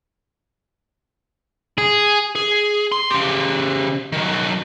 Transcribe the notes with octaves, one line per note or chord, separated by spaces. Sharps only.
G#4
G#4
C6
C#3 G4
D#3 F#3